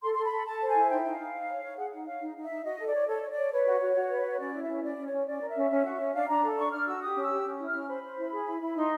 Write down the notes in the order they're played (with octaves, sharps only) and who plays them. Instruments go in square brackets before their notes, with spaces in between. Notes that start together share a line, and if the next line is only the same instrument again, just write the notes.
[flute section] A4 C6
A4 C6
B5
A4
A4 A5
C5
G#5
E4
D#4 G5
D#4 E5
F5
D#4
D#4
C#5
C#5
G#4 F#5
D#4 F#5
C#5 F5
D#4
D#4
E5
D#4
F#4 D#5
A4
D5
C#5
A4 C#5
C#5
D5
C#5
B4 C#5
F#4
F#4
F#4
B4
F#4
C#4 D5
E4
E5
C#4
C#4 D5
C#4
C#5
C#4
C#4 D5
A#4
E5
C#4
C#4
F#4
C#4
D4 F5
D4 A#5
A4
D4 C#6
D4 F6
F#4 E6
G4 D#6
C#4
E6
G4
C#4
E4
F6
C#4
C5 B5
C5
E4
G#4
E4
E4
D#4 C6